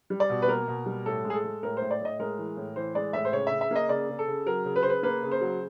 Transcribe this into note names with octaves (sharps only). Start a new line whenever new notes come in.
G3
D5
B2
B4
A#3 A#4
B2
G3
A2 A4
G#3
G#4
A4
G#3
A2 A#4
A2 C5
D5
A2 D#5
G#3 A#4
E3
A2
E3 C5
G#3 D5
A2 E5
C5
C#3 C#5
C#3 E5
E5
A#3 D#5
C#3 D5
C#3
A4
C#3
F#3 A#4
C#3
B4
C#3 C5
B4
A#3 B4
C#3
C5
F#3